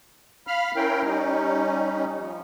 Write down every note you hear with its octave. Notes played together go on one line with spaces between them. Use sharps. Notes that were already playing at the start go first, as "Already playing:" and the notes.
F5 B5 F6
C#4 E4 A#4 G5
G3 C#4 D#4
F3